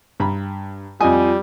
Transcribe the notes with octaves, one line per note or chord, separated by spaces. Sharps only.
G2 A#5 B5
F2 G3 F4 D#5 G#5 D#6